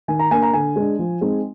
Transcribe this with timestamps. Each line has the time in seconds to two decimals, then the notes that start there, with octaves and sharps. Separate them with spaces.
0.08 D#3 G#5
0.19 A#5
0.31 A#3 D4 G#5
0.42 A#5
0.53 D3 G#5
0.76 G#3 D4
0.99 F3
1.21 G#3 C4 D#4